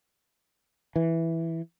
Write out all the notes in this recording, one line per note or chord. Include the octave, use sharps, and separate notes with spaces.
E3